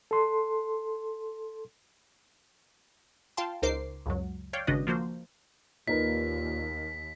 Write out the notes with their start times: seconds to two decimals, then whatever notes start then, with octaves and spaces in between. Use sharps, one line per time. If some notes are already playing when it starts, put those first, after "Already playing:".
0.11 A4 C6
3.37 F4 F5 G5 A5 C6
3.62 C#2 D#4 A#4 C5 D6 C7
4.06 C#2 F#2 F#3
4.53 C#5 D5 F5 G5
4.67 G#1 C#3 D4 F#4 B4 D#5
4.87 F3 A#3 F#4 C5
5.88 D#2 A#2 D#4 A#4 B4 B6